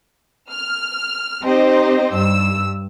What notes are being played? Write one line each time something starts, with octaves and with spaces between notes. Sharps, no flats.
F6
C4 D#4 G4 C5 D#5
G2 E6